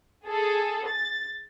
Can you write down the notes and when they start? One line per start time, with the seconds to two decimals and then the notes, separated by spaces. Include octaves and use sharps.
0.26 G#4 A4
0.88 A6